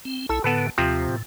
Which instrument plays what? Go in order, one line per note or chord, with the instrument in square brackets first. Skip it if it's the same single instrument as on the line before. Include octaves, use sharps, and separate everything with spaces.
[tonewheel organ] C4
[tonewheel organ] B1 E4 [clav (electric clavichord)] A4
[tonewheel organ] A2 D3 [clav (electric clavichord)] B3 A4 B4
[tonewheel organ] D#2 [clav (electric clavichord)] C3 F3 C4
[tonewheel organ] A2